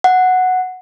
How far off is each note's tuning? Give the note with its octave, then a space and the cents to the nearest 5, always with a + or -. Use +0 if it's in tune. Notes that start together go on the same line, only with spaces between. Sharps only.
F#5 -5